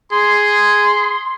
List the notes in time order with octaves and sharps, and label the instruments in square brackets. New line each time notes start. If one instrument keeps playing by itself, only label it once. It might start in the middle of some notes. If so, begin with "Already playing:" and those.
[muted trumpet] G#4 [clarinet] C6